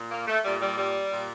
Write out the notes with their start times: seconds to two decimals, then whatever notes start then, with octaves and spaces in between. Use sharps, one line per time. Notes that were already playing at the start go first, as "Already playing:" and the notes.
Already playing: A#2
0.11 A#3
0.27 A3
0.43 A#2 G3
0.61 G3
0.78 G3
1.11 A#2